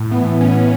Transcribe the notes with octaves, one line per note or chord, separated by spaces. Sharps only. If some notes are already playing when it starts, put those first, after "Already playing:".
Already playing: A2
E3 B3
E3 C#4